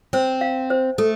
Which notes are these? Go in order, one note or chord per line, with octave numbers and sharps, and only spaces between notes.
C4 C5
F5
C5
A3 A4